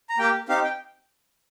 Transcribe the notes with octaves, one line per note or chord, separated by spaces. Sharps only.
A#5
A#3 G4 G5
C4 D#4 G4 F5
G5